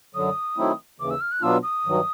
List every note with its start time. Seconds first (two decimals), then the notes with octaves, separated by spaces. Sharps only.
0.14 F#2 D3 F#3 D#6
0.57 D#3 F#3 A3 C4 E4
0.99 D#2 C#3 E3 D6
1.10 E6
1.21 F6
1.32 F#6
1.42 B2 F#3 B3 D4 F4 E6
1.63 D#6
1.85 G2 D#3 F#3